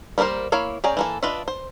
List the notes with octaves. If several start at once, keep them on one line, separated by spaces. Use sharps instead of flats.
G3 A#3 D4 A#4 C5
A#3 E4 C#5 F5
C#4 G#4 D5 G5 A#5
E3 A#3 A4
D4 F4 B4 D#5 E5
C5